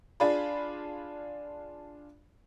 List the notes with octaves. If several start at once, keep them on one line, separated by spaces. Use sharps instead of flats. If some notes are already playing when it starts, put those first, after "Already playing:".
D4 F4 G#4 D5 B5